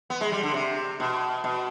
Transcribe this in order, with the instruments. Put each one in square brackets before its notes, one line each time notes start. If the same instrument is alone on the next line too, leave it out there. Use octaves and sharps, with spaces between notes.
[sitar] B3
G#3
G3
D3
C3
B2
B2